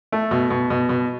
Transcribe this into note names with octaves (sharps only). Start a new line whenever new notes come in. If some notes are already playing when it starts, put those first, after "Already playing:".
A3
B2
B2
B2
B2